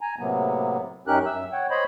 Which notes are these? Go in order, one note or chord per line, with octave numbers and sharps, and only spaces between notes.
G#5 A#5
A2 C3 F#3 A#3 B3
F#2 C#4 D#4 G4 A#4 F#6
F#2 E5 E6
C#5 F#5 G5
C5 C#5 D#5 B5